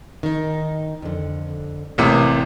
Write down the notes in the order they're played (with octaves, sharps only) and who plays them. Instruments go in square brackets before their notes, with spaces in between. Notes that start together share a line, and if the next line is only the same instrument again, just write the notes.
[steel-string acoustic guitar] D#3 D#4
F2 D3
[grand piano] A1 C3 [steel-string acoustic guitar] A#3